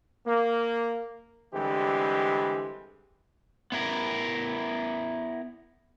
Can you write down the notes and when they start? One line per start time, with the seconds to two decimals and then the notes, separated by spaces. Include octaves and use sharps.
0.26 A#3
1.53 D3 E3 G3 G#3 C4 G4
3.72 B3 E4 A#4